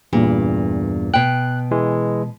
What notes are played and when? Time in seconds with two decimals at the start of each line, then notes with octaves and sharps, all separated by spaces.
0.13 E2 G2 A#2
1.14 B2 G5 F#6
1.71 E3 G#3